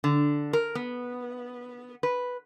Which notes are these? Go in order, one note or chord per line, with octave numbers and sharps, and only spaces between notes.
D3
A#4
B3
B4